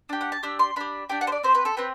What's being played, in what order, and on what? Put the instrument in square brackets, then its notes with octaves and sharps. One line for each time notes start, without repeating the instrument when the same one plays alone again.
[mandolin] D4 G4
F#5
A5
D4 G4 E6
C6
D4 G4 B5
D4 G4 G5
F#5
C5
D5
C4 G4 C5
B4
A4
C4 G4 B4